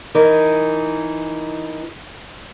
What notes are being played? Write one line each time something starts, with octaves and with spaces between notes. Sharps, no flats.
E3 D#4 A#4